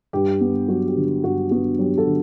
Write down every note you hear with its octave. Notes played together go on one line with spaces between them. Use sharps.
G2 G4
B3
F#3 F#4
G4
D3
G2 F#4
B3 F#4
F#3 G4
F#4 A4
D3